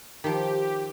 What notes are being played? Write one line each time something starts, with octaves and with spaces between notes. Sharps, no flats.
D#3 F3 G4